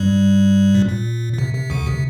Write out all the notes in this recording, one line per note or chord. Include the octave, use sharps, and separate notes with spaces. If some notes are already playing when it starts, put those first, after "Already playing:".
Already playing: G2 G3
A#2
A#2
A#2
C3
C3
D2 D3
C3